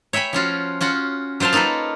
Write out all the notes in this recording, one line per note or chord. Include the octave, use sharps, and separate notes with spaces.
C#5 E5 G5 G#5 B5
F3 C#4 F4 F#4
C#4 F4 F#4 F#5
F#3 F4 C5 F5 A5
A#3 D#4 F4 A4 B4